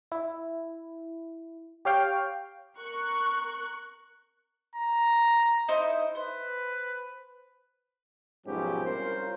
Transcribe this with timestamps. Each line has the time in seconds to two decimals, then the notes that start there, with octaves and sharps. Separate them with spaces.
0.12 E4
1.85 G4 C#5 F5 G5
2.77 A#4 C#6 F#6
4.75 A#5
5.68 D#4 E4 C5
6.15 B4 C5
8.46 B1 G#2 F3 C#4 G4
8.84 C2 C#4 F4 A#4 C5